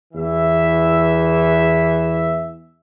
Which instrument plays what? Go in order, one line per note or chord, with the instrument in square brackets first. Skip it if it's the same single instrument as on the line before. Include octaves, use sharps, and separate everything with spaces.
[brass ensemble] E2 E3 E5